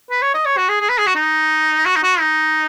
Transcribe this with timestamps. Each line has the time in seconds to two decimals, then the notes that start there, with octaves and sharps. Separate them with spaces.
0.11 B4
0.22 C#5
0.34 D#5
0.45 C#5
0.57 F#4
0.69 G#4
0.80 G#4
0.89 B4
0.98 G#4
1.06 F#4
1.15 D#4
1.85 F#4
1.96 D#4
2.03 F#4
2.20 D#4